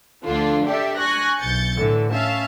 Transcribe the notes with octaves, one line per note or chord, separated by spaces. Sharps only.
D2 D3 F3 D4 F4
D4 G4 A4 D5 E5
G#5 C#6 F#6 A#6
B1 G6 A6 C#7
A2 D3 E3
C#4 E5 F5 A5